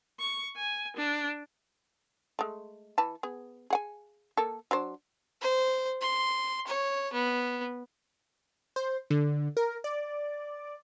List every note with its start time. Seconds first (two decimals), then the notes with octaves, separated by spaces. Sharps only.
0.20 C#6
0.56 G#5
0.96 D4
2.39 G#3 A3
2.98 E3 B4 A5
3.23 B3 G#4
3.70 G#4 F#5 G#5
4.37 A#3 A4
4.71 F#3 D4 C5
5.41 C5
6.01 C6
6.67 C#5
7.13 B3
8.76 C5
9.10 D3
9.57 A#4
9.84 D5